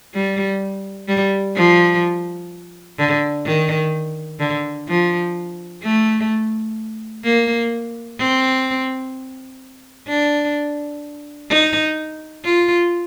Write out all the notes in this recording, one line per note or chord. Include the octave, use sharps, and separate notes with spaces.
G3
G3
F3
D3
D#3
D3
F3
A3
A#3
C4
D4
D#4
F4